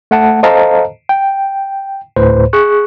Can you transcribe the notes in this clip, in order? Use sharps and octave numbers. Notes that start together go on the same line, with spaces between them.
A3 F#5 A5
A4 C5 D#5 F5 A5 A#5
G5
D2 A2 B4 C5
G#4 C#6 F#6